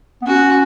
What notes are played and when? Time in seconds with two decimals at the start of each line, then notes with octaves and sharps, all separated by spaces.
0.22 B3
0.27 C#4 F#4